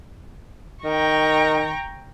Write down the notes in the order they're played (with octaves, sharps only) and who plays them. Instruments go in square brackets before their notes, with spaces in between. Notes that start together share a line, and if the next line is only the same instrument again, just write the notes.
[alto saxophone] D#3 [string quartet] G5 A#5 C#6